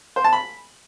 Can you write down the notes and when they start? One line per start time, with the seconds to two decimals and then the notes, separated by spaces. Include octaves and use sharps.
0.16 C5
0.24 A5
0.33 B5